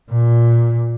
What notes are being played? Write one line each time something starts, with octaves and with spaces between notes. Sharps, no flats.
A#2